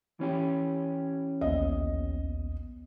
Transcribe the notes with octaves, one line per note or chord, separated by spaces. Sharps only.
E3 C#4 G4
A#1 D#2 B3 D#5